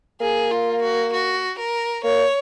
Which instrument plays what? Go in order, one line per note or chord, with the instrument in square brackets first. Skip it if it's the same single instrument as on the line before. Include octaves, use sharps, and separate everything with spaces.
[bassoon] A#3 [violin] G#4
[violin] F4
F#4
F#4
A#4
[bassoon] A#3 [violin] C#5